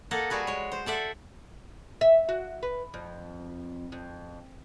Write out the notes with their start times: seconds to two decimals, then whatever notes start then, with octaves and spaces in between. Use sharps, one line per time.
0.11 A#3 A4 D#5 F#5
0.30 G3 F#4 G#4 B4
0.47 G#3 C#5
0.72 C5
0.86 A4 D5 E5 F#5
2.01 E5
2.29 F#4
2.63 B4
2.94 F2
3.92 F2